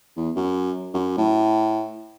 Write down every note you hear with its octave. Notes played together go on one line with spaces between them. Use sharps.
E2
F#2
F#2
A2